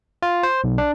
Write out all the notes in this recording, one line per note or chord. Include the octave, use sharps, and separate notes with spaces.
F4
C5
B1
D4